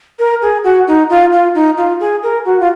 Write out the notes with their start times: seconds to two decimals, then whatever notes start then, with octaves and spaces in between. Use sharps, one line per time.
0.19 A#4
0.42 G#4
0.64 F#4
0.88 D#4
1.10 F4
1.32 F4
1.55 D#4
1.77 F4
2.00 G#4
2.23 A#4
2.45 F#4
2.60 F4